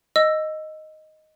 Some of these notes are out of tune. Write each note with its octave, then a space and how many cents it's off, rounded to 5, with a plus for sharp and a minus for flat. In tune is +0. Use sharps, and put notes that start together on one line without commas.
D#5 +0 E6 +10